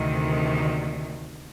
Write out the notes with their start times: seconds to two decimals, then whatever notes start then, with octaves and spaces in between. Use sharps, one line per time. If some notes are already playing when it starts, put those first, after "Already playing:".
Already playing: D2 C3 D#3